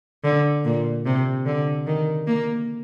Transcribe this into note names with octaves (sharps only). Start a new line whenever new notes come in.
D3
A#2
C3
D3
D#3
A#3